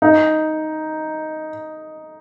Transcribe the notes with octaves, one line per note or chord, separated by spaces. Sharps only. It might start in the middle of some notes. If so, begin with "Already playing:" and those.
D#4